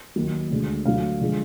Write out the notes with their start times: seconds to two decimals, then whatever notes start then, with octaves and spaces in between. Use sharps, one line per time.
0.16 D#2 D#3 F#3
0.50 D2 D3 G#3
0.85 D2 D3 F#3 F5
1.21 D3 F3 G#3